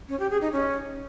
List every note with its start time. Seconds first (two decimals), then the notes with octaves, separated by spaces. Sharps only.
0.09 C#4
0.20 G4
0.30 G#4
0.41 D#4
0.52 C#4